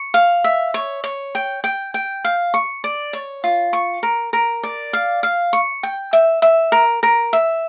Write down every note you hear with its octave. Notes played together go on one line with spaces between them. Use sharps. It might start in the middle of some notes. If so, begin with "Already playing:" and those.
Already playing: C#6
F5
E5
C#5
C#5
G5
G5
G5
F5
C#6
D5
C#5
F4
C#6
A#4
A#4
D5
F5
F5
C#6
G5
E5
E5
A#4
A#4
E5